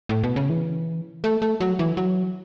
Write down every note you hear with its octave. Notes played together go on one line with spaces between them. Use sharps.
A2
B2
C#3
E3
A3
A3
F#3
E3
F#3